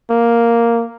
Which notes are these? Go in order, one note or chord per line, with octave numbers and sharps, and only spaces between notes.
A#3